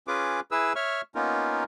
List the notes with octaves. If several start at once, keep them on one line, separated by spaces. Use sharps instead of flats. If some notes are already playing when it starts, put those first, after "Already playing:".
C#4 F4 G#4 B4 D6
E4 G#4 B4 E6
C#5 E5 C#6 F6
A#3 B3 C#4 D#4 F4 A#4